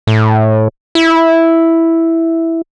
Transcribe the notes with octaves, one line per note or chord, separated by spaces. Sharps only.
A2
E4